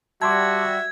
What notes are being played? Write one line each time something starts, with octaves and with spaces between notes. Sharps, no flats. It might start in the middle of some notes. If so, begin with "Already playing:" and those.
G3 F#4 E5 A5 C6 D6 G#6